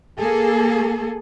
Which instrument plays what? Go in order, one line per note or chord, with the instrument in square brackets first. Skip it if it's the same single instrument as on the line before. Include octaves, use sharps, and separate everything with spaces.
[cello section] A#3 G#4 A4